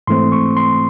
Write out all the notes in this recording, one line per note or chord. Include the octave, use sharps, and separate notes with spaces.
G#2 E3 A3 C4 C6
C#6
C6